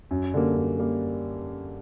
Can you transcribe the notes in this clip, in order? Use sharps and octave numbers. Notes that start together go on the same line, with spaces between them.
F#2
D3 G3 A#3
F#2
G3 A#3